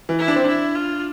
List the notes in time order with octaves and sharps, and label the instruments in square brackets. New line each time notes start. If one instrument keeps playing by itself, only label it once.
[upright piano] E3
[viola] E4
[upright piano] D4
C4
[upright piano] D4 [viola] E4
[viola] F4